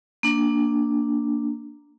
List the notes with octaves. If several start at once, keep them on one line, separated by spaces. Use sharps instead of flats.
A#3 D4